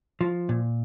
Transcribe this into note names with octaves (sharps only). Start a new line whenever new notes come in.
F3
A#2